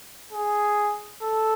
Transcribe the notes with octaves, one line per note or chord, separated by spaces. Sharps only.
G#4
A4